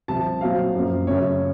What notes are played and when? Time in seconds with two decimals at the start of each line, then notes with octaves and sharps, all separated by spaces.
0.08 C2 C3 F3 A5
0.41 A#2 F#3 C4 F5
0.74 F#2 F3 A#3
1.07 F#2 C#3 A3 C#5